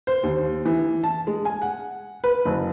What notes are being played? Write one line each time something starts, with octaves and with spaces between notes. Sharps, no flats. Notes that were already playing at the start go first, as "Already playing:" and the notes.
C5
D#2
E3
A5
G#3
G#5
F#5
B4
F#1